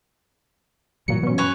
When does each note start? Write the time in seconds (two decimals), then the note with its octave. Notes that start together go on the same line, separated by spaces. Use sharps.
1.08 G2 A#2 E3 F#3 C#7
1.23 B2 C#4
1.38 B4 C#5 G#5